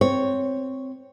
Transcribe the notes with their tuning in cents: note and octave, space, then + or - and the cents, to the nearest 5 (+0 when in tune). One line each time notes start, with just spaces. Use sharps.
C4 +0 C#5 +0